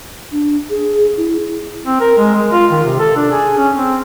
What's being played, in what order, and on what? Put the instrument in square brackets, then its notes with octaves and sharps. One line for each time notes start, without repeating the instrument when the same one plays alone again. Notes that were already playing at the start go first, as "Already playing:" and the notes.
[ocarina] D4
G#4
E4
[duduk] C4
A#4
G#3
G#3
F4
D#3
C3
A4
D4
G#4
C#4
C4